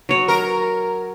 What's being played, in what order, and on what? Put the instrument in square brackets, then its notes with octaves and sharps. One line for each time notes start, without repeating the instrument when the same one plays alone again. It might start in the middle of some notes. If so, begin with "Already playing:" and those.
[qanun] F#3 C#5
[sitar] A#4